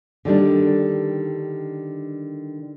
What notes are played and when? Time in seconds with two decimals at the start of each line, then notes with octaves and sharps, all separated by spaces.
0.25 D3 D#3 G3 D4